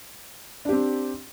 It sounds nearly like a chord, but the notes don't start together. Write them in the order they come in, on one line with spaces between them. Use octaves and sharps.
D4 G4 C4